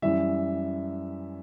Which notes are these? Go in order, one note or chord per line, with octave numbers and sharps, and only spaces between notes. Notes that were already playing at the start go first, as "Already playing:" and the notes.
F#2 E3 G3 E5